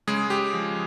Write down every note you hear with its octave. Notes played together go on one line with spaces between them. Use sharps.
C#3 G#3 G#4
G4
F3